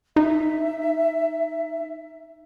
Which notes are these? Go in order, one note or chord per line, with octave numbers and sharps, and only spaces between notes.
D#4 E5